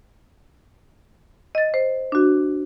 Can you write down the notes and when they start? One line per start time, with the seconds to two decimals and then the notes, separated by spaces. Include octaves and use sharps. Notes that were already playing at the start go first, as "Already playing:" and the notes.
1.55 D#5 A6
1.74 C5
2.12 D4 F#4